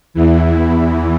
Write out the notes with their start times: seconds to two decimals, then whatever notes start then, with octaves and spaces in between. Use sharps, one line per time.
0.14 E2 E3